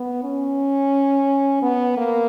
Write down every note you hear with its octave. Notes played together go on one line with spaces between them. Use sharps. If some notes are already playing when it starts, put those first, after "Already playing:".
Already playing: B3
C#4
B3
A#3